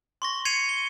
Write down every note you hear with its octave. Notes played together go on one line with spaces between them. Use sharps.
C6 C#6 A#6
G#6 C7 C#7 D#7 F7
G7